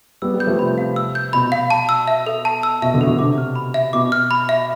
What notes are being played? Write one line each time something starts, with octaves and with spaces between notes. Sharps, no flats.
G3 B3 E6
G3 B3
G6
F3 A3
C3 B5
F5
E6
G6
B2 B5
F5
A5
E6
E5
A4
A5
E6
B2 E5
B2 D3
A4
B2 D3
C3 D6
F6
B5
E5
B2 D6
F6
B5
E5